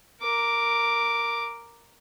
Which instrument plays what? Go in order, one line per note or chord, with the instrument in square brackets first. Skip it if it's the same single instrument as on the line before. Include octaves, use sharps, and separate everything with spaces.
[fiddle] A#4 D6